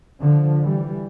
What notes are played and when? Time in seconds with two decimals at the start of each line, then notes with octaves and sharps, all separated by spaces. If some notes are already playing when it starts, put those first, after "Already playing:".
0.22 D3 F3
0.62 E3 G3